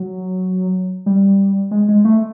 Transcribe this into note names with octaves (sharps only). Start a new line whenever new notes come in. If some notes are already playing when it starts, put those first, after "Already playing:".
Already playing: F#3
G3
G#3
G#3
A3